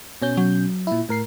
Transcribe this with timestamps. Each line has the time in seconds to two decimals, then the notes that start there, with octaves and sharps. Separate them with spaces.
0.22 B2 C#4 G6
0.37 F#3
0.87 A#2 E4
1.09 A2 A#4 C7